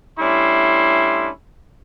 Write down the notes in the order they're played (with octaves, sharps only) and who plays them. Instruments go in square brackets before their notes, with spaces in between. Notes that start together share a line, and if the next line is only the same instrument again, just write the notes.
[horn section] G3 A3 C#4 D4 E4 C6